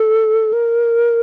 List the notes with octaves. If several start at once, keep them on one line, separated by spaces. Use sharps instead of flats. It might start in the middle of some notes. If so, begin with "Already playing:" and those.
Already playing: A4
A#4